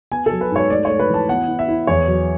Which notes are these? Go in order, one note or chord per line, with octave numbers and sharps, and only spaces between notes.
B3 G#5
A4
F#3
B4
G#2 C#5
A3 D5
A3 C#5
B4
E3 A5
B3 F#5
E4
E5
E4
E2 C#5
F#3